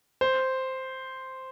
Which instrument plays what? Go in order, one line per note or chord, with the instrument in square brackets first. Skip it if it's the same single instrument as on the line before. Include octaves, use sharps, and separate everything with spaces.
[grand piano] C5